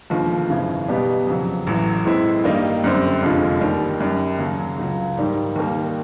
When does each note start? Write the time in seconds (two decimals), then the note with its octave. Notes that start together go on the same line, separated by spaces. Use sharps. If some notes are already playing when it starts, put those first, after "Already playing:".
0.10 E1 D#2 D3 F3
0.49 G#1 F#2 C#3 E3
0.88 B2 G3 B3 D#4 G4
1.27 F2 C#3 F#3
1.67 A1 A2 F#3
2.05 A2 E3 G#3 C4 E4
2.44 G2 D#3 G3 A#3 D#4
2.84 F#2 D3 G3 C4
3.22 F1 F2 D3 F3 G#3
3.61 D#2 D#3 G3
4.00 F#2 D#3 G3
4.39 D#2 C#3 F#3
4.78 C#2 C#3 F#3
5.17 G#2 D#3 G3
5.56 D#2 D#3 G3 A#3